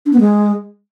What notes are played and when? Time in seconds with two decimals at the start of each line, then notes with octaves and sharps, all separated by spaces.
0.06 D4
0.13 B3
0.20 G#3